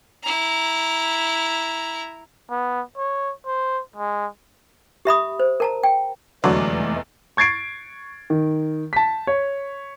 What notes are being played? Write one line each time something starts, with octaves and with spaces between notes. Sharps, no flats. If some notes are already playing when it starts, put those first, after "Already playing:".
E4 A#5
B3
C#5
C5
G#3
G4 E5 B5 D#6
C5
A#4 A5 A#5
G5
F1 E2 D3 E3 F#3 G#3 A3 D5
C#6 G#6 A6 C7 D7
D#3
A5 B6
C#5